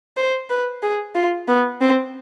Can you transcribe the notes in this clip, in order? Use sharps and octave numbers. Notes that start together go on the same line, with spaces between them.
C5
B4
G#4
F4
B3
C4